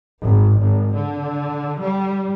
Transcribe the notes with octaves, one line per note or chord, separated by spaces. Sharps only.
G#1
G#1
D3
G3